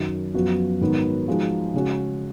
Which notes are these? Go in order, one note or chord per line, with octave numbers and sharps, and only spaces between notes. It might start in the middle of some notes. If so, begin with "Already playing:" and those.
Already playing: F#2 D#3 F#3
F#2 F3 B3 F#4
G#2 D#3 F#3 B3 F#4
F3 G#3 D#4 F#4
C#3 G#3 C#4 F#4